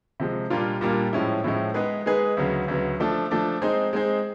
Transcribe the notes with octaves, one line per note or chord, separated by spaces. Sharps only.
C3 F3 G#3
A#2 G3 A#3 D4 F4
A#2 G3 A#3 D4 F4
A2 F3 G#3 C#4 E4
A2 F3 G#3 C#4 E4
G#3 B3 D#4 G#4 B4
G#3 B3 D#4 G#4 B4
D2 C#3 F#3 B3
D2 C#3 F#3 B3
F3 A3 D4
F3 A3 D4
G#3 C4 D#4 G#4 C5
G#3 C4 D#4 G#4 C5